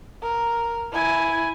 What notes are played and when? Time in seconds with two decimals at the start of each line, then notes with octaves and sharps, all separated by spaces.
0.22 A#4
0.92 E4 G#5